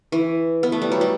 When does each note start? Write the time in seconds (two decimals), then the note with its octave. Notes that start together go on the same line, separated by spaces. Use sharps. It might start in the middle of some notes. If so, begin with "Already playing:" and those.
0.12 E3
0.63 B3
0.72 A3
0.82 G3
0.92 F#3
1.01 G3